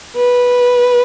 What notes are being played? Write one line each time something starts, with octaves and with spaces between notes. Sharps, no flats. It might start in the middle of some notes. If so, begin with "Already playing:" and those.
B4